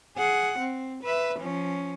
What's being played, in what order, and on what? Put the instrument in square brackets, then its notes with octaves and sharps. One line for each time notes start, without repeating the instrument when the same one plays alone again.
[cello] G#4 F#5
C4
B4 E5
F3 C#4